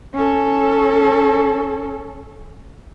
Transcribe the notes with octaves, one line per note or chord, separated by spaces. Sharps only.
C#4 A4